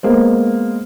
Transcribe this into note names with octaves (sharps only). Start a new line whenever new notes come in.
G#3 A#3 B3 C5